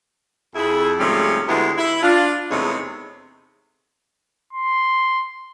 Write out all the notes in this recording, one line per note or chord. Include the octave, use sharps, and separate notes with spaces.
F2 E4 G#4
G#2 C3 F3 G3 A3 C#4
D2 D3 G#3 B3 E4 G4
E4
D4 F4
E2 C3 G#3 A3 D#4 C#5
C6